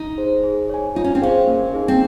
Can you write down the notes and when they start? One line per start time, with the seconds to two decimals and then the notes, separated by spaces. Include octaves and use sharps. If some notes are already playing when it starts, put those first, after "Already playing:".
Already playing: D#4
0.18 G#4 C5
0.44 G#4
0.69 C#5 G#5
0.95 D#4 F4
1.04 C#4
1.15 C4
1.22 C#4 G#4 C5 F5
1.48 A#3
1.74 D#4 G#4
1.88 C4